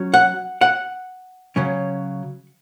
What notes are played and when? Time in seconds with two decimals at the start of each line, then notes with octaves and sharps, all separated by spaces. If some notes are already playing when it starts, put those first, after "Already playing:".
Already playing: F#3 C#4
0.14 F#5
0.61 F#5
1.56 C#3 F#3 C#4